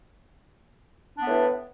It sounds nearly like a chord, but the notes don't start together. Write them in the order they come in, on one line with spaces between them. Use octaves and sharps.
D4 B3 A2 E3